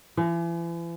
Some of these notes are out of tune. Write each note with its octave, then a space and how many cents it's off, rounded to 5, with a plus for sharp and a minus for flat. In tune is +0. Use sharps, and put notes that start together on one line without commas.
E3 +40